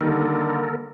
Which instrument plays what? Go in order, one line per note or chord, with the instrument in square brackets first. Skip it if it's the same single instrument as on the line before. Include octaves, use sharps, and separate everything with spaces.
[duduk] D3 [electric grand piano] D#3 G3 D#4 [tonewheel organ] A#3 A4 A#4